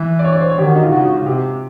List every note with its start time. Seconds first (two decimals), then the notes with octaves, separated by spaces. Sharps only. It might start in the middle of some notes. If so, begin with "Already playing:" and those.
Already playing: E3
0.19 D5
0.24 C#5
0.32 D5
0.41 C5
0.49 C#5
0.58 D#3 G4
0.66 F#4
0.75 D#4
0.83 F4
0.92 C#3 F#4
1.25 C3 G4